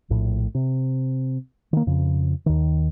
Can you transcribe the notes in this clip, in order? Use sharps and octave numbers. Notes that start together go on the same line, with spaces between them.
A#1 A2
C3
D#3 A#3
F2 C#3
D#2 D#3